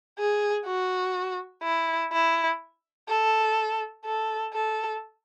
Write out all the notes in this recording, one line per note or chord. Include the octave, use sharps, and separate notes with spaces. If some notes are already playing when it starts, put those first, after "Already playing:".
G#4
F#4
E4
E4
A4
A4
A4